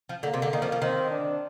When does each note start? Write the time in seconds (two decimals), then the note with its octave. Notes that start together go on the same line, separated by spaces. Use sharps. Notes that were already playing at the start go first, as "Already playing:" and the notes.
0.09 F3
0.23 D3 A#3
0.34 C3
0.42 D3
0.53 D#3 A#3
0.62 F3
0.72 F3
0.82 D#3 C4
1.11 D4